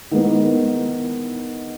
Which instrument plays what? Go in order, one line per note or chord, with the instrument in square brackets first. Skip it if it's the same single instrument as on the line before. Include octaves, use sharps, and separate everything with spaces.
[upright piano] D#3 G#3 B3